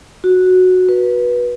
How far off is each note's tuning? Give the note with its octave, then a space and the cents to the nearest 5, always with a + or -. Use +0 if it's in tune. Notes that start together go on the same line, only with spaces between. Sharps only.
F#4 -5
B4 -20